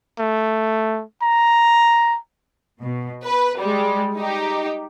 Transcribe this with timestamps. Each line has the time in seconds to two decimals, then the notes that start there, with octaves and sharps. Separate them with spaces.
0.19 A3
1.22 A#5
2.81 B2
3.23 B4
3.59 G3 G#3
4.17 D#4 G4